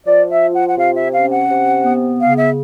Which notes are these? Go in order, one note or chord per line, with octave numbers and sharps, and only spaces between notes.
F3 D5
E5
F4
F#5
F#5
C3 F5
E5
C#4 F5
F#5
C3
B3
C#3 F5
E5